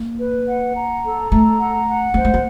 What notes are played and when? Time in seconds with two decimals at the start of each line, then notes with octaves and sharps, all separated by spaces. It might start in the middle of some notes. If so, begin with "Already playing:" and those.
Already playing: A#3
0.21 B4
0.48 F#5
0.77 A#5
1.04 A4
1.32 A3 A#5
1.59 F#5
1.88 F#5
2.14 A#3 C5
2.25 A3
2.34 A#3